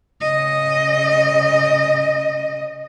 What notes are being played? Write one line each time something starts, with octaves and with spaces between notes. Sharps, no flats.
C#3 D#5